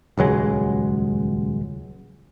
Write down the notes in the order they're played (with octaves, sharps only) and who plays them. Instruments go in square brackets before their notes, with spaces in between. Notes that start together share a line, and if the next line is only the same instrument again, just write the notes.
[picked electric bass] D#1 C#2 F#3 G#3